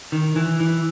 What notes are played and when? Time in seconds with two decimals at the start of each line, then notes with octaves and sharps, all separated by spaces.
0.12 D#3
0.36 E3
0.60 E3